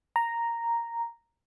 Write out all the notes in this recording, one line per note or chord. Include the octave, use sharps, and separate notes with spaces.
A#5